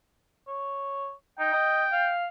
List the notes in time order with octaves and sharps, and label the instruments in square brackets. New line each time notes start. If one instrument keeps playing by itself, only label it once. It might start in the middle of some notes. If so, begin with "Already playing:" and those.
[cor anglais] C#5
[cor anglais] D#4 [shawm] G5
[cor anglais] D#5
F5